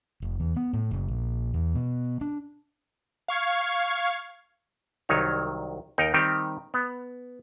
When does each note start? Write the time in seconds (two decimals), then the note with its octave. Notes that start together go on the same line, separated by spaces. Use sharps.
0.22 F1
0.40 E2
0.56 B3
0.73 A2
0.91 F#1
1.08 A#1
1.54 E2
1.75 B2
2.21 D4
3.28 F5 C#6 G#6
5.09 C2 D#3 F#3 D#4 C#5
5.98 D#2 D#4 A#4 G5
6.14 D#3 G3 C4 D#4 G4
6.74 B3